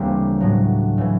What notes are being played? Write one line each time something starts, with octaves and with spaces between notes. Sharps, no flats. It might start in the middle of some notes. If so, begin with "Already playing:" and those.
Already playing: D2 C#3 E3 G3 A#3 C4 G4
A2 F#3
C#3 E3